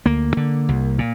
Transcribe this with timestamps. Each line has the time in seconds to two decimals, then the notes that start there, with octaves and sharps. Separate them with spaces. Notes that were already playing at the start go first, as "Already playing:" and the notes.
0.05 D2 A#3
0.37 D3
0.69 C2
0.99 A#2